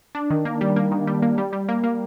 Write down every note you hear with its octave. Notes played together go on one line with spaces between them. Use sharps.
D4
D#3
A#3
G3
A#3
D#3
G3
A#3
G3
G3
A#3
A#3